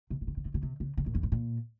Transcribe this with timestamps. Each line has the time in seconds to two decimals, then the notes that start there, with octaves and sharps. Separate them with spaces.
0.10 C3
0.21 A#2
0.27 C3
0.37 C#3
0.45 C3
0.54 C#3
0.63 C3
0.80 C#3
0.97 C3
1.06 A#2
1.15 F2
1.23 G2
1.32 A#2